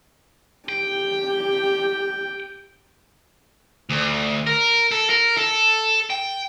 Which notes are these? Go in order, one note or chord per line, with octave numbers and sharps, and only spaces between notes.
G4 G5
D2
A#4
A4
A#4
A4
G5